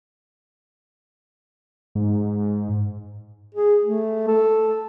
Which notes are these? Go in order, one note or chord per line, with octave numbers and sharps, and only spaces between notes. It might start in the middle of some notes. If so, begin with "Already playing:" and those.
G#2
G#4
A3
A4